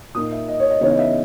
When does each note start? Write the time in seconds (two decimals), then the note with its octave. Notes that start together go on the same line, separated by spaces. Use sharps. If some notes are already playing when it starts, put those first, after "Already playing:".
0.15 A#2 A#3 D#4 D#6
0.32 E5
0.48 D#5
0.60 C#5
0.70 D#5
0.81 C#3 E3 B3 D#4 C#5
0.90 D#5
0.99 E5
1.07 D#5